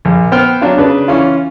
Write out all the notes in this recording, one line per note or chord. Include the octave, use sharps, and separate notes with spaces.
A#1
B3 C5 G5 F6
F#3 D4 F4
C#3 D4 B4
E3 C#4 F4